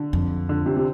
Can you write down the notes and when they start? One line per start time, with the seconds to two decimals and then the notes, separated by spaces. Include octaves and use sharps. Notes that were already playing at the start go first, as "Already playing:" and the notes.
Already playing: D3
0.13 F2
0.49 D3
0.66 C3
0.77 C3